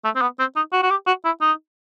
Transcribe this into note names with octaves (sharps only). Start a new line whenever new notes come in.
A3
C4
B3
C4
D#4
F#4
F#4
G4
F#4
E4
D#4